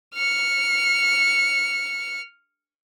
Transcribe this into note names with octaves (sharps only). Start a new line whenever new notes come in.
F6 C#7